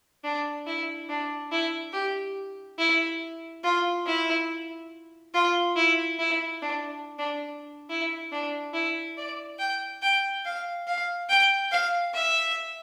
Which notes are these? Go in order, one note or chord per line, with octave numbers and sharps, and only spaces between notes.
D4
E4
D4
E4
G4
E4
F4
E4
F4
E4
E4
D4
D4
E4
D4
E4
D5
G5
G5
F5
F5
G5
F5
E5